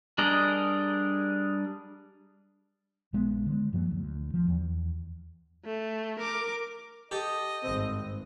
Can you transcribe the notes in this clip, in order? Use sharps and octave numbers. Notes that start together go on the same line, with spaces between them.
G3 D4 G#4 A#4 D#5
A#1 G#3 B3
D3 G#3
F#2 F3 F#3 A#3
D2
F3
E2
A3
A#4 D6
G4 A4 D#5
G#1 G2 C4